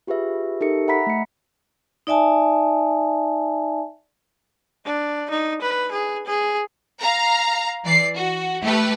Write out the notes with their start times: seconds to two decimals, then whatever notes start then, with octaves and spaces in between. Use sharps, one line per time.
0.07 F4 G4 G#4 B4 E5
0.61 D#4 G4 A4 A#4 E5 C#7
0.88 E5 F#5 A#5 B5 B6
1.07 A3 C#7
2.07 D#4 D5 E5 G#5 A5
4.86 D4
5.31 D#4
5.62 B4
5.92 G#4
6.27 G#4
7.00 F5 A#5
7.84 E3 D5 C7
8.16 F#4
8.62 A3 G4 B4